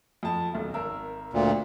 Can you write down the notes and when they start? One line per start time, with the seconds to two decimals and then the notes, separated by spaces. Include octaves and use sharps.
0.23 F2 A5
0.53 D#1 B1
0.74 G#1 A#4 E6
1.33 D2 A#2